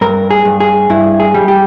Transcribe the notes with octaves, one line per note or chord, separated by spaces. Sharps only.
G2 A#4
G#4
G2
G#4
G2 E4
G#4
G3
G4